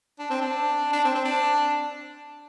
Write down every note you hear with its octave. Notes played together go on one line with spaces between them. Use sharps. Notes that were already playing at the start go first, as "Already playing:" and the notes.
D4
C4
D4
D4
C4
C4
D4